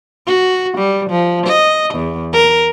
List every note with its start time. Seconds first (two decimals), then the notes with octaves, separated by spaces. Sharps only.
0.27 F#4
0.78 G3
1.10 F3
1.46 D#5
1.95 E2
2.33 A#4